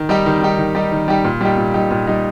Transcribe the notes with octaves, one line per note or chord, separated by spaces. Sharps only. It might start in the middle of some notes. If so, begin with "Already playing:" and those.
Already playing: D#3
G3 D#4 G4
D#3
G3 D#4 G4
D#3
G3 D#4 G4
D#3
G3 D#4 G4
A#2
G3 D#4 G4
A#2
G3 D#4 G4
A#2
G3 D#4 G4